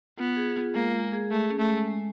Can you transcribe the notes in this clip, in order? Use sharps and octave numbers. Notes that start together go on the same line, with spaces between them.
B3 F4
G#4
F4
G#3 A#3
G#3
G#4
A3 G#4
C#4
A3
G#3
G#3